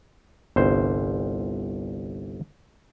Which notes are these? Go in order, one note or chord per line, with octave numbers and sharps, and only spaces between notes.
G1 C2 C5